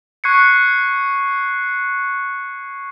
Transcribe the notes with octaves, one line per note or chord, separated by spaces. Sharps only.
C#6 F#6 G#6 C7 C#7